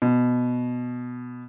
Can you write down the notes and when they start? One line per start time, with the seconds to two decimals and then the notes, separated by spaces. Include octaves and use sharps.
0.02 B2